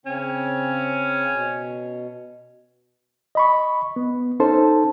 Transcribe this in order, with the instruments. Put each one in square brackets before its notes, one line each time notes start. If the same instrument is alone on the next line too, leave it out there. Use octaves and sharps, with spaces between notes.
[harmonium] C#3 C4 [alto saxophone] C#4
[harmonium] B2
[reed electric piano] D#5 B5 C#6
B3
C#4 D#4 A4 C5 A5